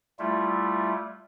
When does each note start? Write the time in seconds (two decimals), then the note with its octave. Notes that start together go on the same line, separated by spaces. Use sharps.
0.19 G3 A3 E4 F4